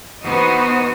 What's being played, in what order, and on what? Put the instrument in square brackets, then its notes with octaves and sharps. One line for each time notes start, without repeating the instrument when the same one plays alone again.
[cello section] E3 B3 D#4 F#4 C5 D#5